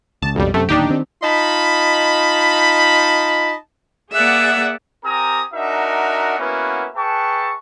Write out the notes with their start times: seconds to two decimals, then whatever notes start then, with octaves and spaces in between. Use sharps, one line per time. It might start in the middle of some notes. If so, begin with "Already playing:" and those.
0.22 C#2 A5
0.35 B1 F2 G3
0.54 F#2 C3 A3
0.69 D1 D#2 D4 D#4 G4
0.89 D#3 C4
1.23 D#4 F4 D#5 A5 B5
4.13 A#3 G#4 D5 E5 F#5
5.05 C4 G4 A#4 G#5 A#5 D#6
5.54 D4 D#4 F#4 A#4 E5 F#5
6.39 A#3 B3 C#4 E4 F#4 B4
6.96 G#4 B4 E5 G5 A5 C#6